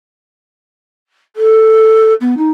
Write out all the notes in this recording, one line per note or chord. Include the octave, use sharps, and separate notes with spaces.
A4
B3
D#4